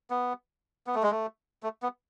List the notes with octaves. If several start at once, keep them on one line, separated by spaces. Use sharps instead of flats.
B3
B3
A3
G#3
A3
A3
B3